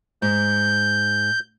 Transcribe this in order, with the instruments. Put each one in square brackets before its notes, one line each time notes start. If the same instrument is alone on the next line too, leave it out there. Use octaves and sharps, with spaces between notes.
[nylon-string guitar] G#2 [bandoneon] G6